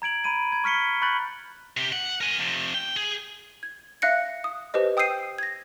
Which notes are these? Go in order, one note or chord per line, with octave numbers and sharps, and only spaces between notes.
A#5 G#6 D7 F#7
A#5 B5 D#7
G#6
C#6 F6 B6 C#7 G7
B5 C#6 F#6 G6 A6 F#7
C3 G4
F#5
A#4 G#5
F2 C3
G5
G#4
G#6
E5 F5 F#6 A#6 C#7
D#6
G4 B4 C5 D#5
G5 D#6 E6 G6 C7 D#7
G#6 A#6